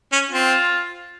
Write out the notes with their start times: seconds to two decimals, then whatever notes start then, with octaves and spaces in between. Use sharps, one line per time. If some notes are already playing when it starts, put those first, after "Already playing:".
0.13 C#4
0.31 C4 F4